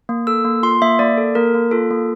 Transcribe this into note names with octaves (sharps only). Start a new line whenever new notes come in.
A#3
A4 E6
A#3
F4 C6
A#3 E5
A#3 D5
A4
A#3 A#4
A#3
F4 A4
A#3